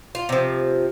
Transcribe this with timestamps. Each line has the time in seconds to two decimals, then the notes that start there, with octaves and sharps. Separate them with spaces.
0.15 F4
0.29 C3 F3